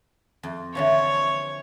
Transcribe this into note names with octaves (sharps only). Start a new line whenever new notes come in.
F2
D3 E3 F3 C#5